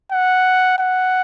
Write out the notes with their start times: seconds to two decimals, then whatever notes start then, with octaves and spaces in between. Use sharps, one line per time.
0.12 F#5
0.79 F#5